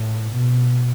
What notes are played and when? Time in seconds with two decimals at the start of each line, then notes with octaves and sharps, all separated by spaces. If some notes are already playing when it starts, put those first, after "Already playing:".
Already playing: A2
0.33 B2